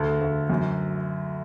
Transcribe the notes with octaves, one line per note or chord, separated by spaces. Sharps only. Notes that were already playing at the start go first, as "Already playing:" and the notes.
Already playing: D2 A4
D2
F#2